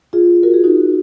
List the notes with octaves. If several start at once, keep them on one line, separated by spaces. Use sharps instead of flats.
F4 G#4
F#4 A#4
F4 G#4
D#4 F#4